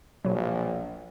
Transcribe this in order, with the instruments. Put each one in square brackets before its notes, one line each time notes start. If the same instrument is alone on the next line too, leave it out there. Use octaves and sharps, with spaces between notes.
[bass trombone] A#1 [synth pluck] B2 F#3